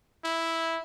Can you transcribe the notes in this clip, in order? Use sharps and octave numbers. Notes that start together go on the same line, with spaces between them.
E4